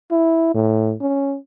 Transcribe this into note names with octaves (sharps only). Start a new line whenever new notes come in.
E4
A2
C#4